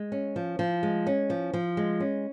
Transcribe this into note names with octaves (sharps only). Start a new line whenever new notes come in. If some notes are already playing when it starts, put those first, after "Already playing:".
Already playing: G#3
C#4
F3
F3
G#3
C#4
F3
F3
G#3
C#4